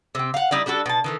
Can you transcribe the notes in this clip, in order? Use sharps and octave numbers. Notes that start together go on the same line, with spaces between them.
C3 C4
F5 F#5
G3 D#4 E4 D5
G3 D4 F#4 A4
B2 A5
D#3 E3 A3